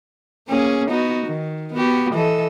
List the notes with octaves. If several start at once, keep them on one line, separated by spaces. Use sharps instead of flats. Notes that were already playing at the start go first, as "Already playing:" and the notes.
A#3 C#4 G#4
B3 D#4 F#4
D#3
B3 F#4 G4
E3 A4 D#5